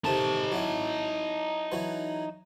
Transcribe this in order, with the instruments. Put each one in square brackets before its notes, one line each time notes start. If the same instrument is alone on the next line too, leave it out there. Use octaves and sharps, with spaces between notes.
[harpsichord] C3 D#3 A4 [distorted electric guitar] D#4 A5
[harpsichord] F#3 E4 F#5
E3 F#3 B4